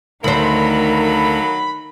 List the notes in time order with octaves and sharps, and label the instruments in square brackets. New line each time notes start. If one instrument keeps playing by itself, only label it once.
[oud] D2 C5 [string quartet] D#3 A#4 [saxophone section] F#3 A#3 A4 [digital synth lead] B5